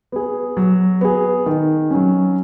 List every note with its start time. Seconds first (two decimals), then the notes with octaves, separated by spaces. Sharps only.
0.12 B3 G#4
0.57 F#3
1.01 B3 G#4
1.46 D#3
1.91 F#3 C#4